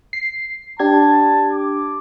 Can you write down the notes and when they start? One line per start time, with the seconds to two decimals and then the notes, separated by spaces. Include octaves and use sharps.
0.13 C7
0.79 D4 G4 A5 G#6
1.52 D6